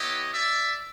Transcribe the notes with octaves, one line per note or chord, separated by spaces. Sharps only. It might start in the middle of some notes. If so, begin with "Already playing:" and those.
Already playing: B3 E4 G4 C#5 D#5
D5 E5